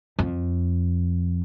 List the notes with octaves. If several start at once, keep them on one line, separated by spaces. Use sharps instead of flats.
F2